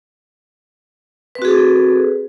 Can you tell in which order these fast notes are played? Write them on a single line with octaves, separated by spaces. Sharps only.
B4 C4 F#4 G#4 A4